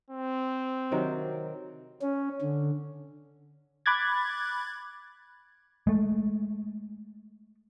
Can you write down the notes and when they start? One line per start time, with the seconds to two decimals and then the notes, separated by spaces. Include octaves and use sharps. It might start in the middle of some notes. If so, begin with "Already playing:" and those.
0.10 C4
0.91 C3 D#3 F#3
2.02 C#4
2.42 D3
3.86 B5 D6 F#6 G#6 A6
5.87 G#3 A3